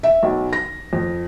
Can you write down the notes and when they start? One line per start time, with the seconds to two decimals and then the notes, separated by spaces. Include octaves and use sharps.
0.03 E5
0.23 B1
0.53 A#6
0.93 F2